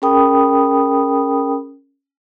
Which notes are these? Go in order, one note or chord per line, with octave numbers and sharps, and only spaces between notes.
C#4 G#4 A#4 G5 B5 D#6